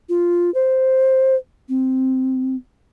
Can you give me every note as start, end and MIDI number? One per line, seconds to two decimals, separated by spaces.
0.09 0.53 65
0.54 1.35 72
1.69 2.56 60